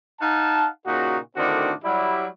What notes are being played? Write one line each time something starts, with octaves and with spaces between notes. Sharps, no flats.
D#4 F5 F#5 A5
A#2 C#3 D#4 F#4
A2 D3 D#3 C4 D4 F#4
F#3 G3 E4